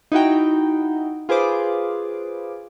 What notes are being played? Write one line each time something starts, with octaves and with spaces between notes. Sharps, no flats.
D#4 E4 F#4 G5
F4 G#4 B4 C5 D6